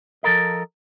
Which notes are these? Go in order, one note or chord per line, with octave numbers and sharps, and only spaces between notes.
F3 A4 A#4 D#5